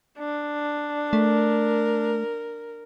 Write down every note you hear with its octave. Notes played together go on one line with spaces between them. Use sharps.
D4
A3 A#4